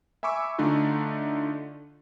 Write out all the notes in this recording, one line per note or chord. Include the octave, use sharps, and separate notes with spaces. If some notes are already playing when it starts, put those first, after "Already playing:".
E5 G#5 B5 C#6 D6 E6
D3 A3 D4 D#4 F4